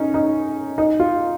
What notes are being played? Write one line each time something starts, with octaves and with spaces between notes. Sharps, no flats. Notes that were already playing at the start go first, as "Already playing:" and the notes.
Already playing: C#4 D#4
D#4
D#4
F4